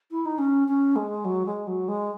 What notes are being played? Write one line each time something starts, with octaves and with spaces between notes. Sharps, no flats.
E4
D#4
C#4
C#4
G#3
F#3
G#3
F#3
G#3